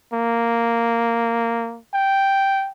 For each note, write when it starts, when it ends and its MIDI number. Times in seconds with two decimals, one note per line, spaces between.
0.13 1.79 58
1.94 2.70 79